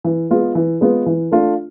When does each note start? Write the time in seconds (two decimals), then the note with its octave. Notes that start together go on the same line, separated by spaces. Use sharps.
0.04 E3
0.31 G#3 B3 F4
0.55 E3
0.81 G#3 B3 F4
1.06 E3
1.32 A3 D4 F4